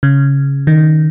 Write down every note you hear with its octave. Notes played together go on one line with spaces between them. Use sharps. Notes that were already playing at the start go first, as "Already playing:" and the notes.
C#3
D#3